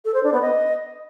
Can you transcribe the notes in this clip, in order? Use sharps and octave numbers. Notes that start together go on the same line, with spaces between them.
A4
C5
D4
B3
D#5